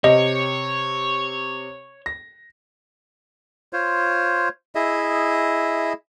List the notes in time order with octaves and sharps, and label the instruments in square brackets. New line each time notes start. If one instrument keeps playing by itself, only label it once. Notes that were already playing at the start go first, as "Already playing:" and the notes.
[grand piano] C3 [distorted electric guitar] C#5 [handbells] D#5
[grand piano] A#6
[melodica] F4 C5 C#5
E4 G#4 D#5 E5